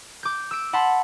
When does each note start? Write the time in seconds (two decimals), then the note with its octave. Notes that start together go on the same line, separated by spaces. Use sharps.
0.23 D6 G6
0.51 E6 D7
0.73 F#5 A5 B5 C6